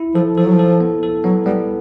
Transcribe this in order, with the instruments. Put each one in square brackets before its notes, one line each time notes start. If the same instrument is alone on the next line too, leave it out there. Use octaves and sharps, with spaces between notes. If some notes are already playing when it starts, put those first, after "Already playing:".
Already playing: [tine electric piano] E4
[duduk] F3 [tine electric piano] A4
[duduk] F3 [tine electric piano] A4
[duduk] F#3
[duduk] F3 [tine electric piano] A4
[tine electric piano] B3
A4
[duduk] F#3 [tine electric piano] B3
[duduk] G3 [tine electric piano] B3